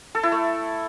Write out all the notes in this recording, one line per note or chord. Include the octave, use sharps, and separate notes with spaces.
A4
E4
A3